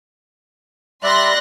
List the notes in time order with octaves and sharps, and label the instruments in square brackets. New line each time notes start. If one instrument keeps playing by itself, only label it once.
[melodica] G3 D5 E5 [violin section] C6 F#6 A#6